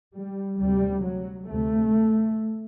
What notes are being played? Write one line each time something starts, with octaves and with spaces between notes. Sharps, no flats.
G3
D2 C3 G3
F#3
D2 C3 A3